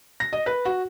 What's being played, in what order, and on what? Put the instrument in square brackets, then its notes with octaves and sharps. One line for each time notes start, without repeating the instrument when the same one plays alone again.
[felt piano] A#6
D#5
B4
F#4